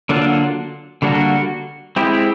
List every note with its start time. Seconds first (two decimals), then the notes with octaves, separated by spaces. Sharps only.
0.09 D3 F#3 A#3 D4 F4
1.02 D3 G3 A#3 D4 F#4
1.96 G#3 C4 E4 G4